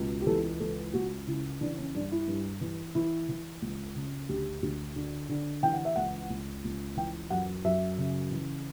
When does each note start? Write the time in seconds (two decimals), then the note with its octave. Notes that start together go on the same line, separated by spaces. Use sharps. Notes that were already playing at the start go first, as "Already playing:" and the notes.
Already playing: C#2 B2
0.21 G4
0.27 E3 A4
0.60 C#2 A4
0.94 C#2 F#4
1.27 C#3 E4
1.61 E3 D4
1.78 C#4
1.95 G2 D4
2.12 E4
2.28 G2
2.61 E3
2.95 E3 E4
3.29 E3
3.62 C#2
3.95 C#3
4.29 D2 G4
4.62 D2
4.96 D3
5.29 D3
5.63 E3 G5
5.73 F#5
5.85 E5
5.96 C#2 F#5
6.30 C#2
6.64 C#2
6.97 E3 G5
7.30 F#2 F#5
7.64 F#2 E5
7.98 C#3
8.31 E3